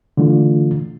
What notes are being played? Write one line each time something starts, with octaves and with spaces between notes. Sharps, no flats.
D3 E3 A3 D4 F4